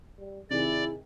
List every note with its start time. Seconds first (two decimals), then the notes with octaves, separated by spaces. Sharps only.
0.18 G3
0.50 C3 D#3 E4 G#4 D5